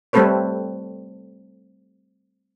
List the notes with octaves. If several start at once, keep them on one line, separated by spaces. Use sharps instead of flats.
G3 A3 C4 A4 B4 C#5